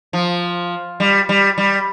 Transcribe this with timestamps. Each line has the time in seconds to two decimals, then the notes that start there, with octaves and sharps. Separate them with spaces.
0.13 F3
1.00 G3
1.29 G3
1.58 G3